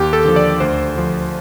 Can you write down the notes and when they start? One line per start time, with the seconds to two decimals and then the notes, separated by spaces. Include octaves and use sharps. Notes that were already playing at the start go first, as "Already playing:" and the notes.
Already playing: D#2 G4
0.13 A4
0.25 D3 F3
0.36 D5
0.60 D2 C5
0.95 D3 F3